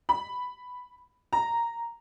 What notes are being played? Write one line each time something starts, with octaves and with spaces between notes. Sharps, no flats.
B5
A#5